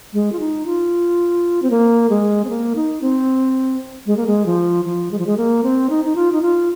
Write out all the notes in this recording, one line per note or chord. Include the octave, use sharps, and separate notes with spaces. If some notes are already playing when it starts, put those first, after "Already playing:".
G#3
F4
D#4
F4
C4
A#3
G#3
C4
A#3
D#4
C4
G#3
A#3
G#3
F3
F3
G#3
F3
G#3
A#3
C4
D#4
D#4
F4
D#4
F4